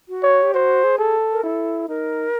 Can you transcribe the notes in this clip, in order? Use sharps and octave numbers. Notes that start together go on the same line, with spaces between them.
F#4
C#5
G4
F#4 C5
G#4
A4
A#4
E4 A4
D#4 A#4